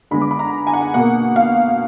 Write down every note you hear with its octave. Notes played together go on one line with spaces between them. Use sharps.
D3 G#3 B3 B5
D6
B5
A#5
G#5
F#5
G#5
B2 A#3 F#5
F5